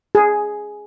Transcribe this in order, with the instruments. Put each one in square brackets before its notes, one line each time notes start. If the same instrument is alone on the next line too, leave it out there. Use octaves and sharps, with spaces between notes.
[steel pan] G#4